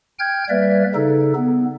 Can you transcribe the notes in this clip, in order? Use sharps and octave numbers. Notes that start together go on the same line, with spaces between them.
G5 F6 G6 G#6
G3 A#3 B4 D5 E5
C#3 D#4 A4
B3